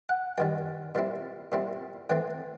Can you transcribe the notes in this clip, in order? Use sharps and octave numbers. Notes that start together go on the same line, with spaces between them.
F#5
F#2 D#3 G3 G5
A#2 G3 C4 E4
A#2 G3 C4 E4
A2 E3 A3 C4 G5